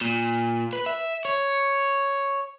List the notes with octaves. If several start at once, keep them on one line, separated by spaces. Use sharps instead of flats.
A#2
B4
E5
C#5